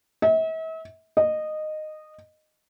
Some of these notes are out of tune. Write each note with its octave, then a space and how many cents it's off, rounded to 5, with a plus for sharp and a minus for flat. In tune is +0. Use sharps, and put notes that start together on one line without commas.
E5 -45
D#5 -15